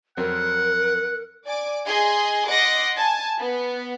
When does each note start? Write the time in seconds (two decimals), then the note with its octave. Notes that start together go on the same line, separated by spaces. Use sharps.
0.17 F2 F#3 C4 A#4 F#5
1.45 D5 G#5 D6
1.86 G#4 D#5 G#5 C6
2.48 D#5 F#5 C6 D6 D#6 A#6
2.96 G#5 A5
3.38 B3